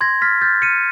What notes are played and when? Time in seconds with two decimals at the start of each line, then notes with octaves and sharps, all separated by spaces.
0.01 C6 G#6 A#6
0.22 F6 A6 B6
0.41 F6 G6 A6
0.62 F6 C#7 D#7